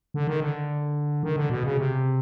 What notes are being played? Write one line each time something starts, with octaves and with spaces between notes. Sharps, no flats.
D3
D#3
D3
D#3
D3
B2
C#3
C3